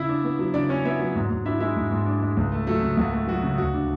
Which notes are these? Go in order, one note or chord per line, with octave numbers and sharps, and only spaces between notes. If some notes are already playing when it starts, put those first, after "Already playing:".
Already playing: C#3 E4 E5
D4
B3
F#3
C#3 D4 D5
C#4 D4 C#5
B3 E4 E5
F#3
G#2
G#2
D4 E4 E5
G#3 E4 E5
G#2
G#2
D4
G#3
C#2
A3
F#3 A3 A4
C#3
C#2 F#4
A3
F#3 F#4
C#3
D2 F#4
D4